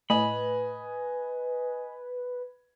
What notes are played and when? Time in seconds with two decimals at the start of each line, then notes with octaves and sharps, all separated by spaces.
0.10 A2 B4 D#5 G#5 B5